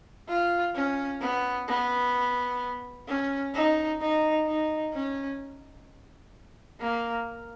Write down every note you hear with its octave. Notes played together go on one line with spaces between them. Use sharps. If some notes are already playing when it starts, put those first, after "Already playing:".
F4
C#4
B3
B3
C#4
D#4
D#4
D#4
C#4
A#3